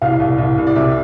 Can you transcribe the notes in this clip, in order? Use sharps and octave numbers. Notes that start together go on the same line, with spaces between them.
C2 F5
C2
C2
C2
D5
C3 E5